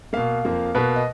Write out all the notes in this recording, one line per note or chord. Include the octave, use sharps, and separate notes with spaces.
B2 A#3 F5
F2 F3 A#3
B2 A#3 B4
D#5